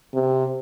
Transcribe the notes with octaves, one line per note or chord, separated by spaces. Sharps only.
C3